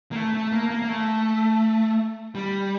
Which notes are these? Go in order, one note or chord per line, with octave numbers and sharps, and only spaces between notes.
A#3
A3
A3
A#3
A#3
A#3
A3
G3